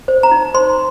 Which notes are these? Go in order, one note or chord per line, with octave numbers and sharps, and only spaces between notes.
C5
A#5
D#4
C5 C6